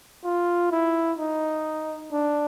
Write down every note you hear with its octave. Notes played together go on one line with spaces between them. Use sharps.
F4
E4
D#4
D4